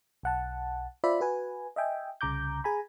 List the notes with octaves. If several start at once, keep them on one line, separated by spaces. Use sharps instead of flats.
B1 F#5 A5
F4 C5 D5 E5 B5
F#4 B4 G#5
D#5 E5 G5 G#5
C2 C#3 A#5 D6 G6
G#4 G#5 A#5 B5